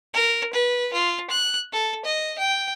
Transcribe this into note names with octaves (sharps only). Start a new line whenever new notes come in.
A#4
B4
F4
F#6
A4
D#5
G5